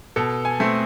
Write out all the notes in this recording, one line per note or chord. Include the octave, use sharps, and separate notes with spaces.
B2 A4
G#5
A3 C4